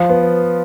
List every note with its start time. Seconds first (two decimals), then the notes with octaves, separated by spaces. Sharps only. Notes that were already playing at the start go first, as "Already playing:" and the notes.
Already playing: F3
0.09 B3